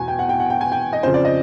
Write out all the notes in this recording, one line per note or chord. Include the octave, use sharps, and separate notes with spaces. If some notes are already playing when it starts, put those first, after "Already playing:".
Already playing: E2 B2 G#5
G5
F#5
G5
F#5
G5
G#5
G5
D#5
F2 C#3 F3 C5
D5
D#5